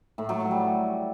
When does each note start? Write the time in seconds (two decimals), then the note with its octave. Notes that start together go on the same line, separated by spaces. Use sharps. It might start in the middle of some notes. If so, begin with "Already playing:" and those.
0.18 A2
0.29 F#3
0.40 F#3
0.51 G3